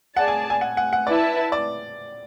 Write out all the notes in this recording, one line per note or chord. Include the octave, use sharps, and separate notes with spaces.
G#4 D5 F#5 A5
G#5
G#5
F#5
F#5
F#5
E4 B4 D5 E5 A5
D5